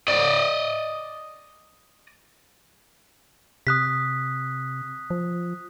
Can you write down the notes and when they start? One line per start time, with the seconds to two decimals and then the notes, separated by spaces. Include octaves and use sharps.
0.08 D5 D#5
3.67 C3 D#6 F#6 B6
5.10 F3